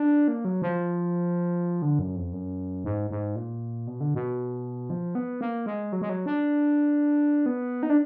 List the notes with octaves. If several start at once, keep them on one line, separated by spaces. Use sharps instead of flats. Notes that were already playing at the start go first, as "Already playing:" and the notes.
Already playing: D4
A#3
F#3
F3
D3
F#2
F2
F#2
G#2
G#2
A#2
B2
D3
B2
F3
B3
A#3
G#3
F#3
G#3
F#3
D4
B3
D#4
D4